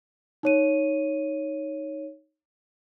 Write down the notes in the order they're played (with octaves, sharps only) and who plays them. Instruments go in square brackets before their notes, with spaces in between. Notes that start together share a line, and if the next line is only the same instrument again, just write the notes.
[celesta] D#4 C#5 D#7